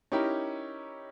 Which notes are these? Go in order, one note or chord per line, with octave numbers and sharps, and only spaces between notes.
C#4 D#4 E4 G4 A#4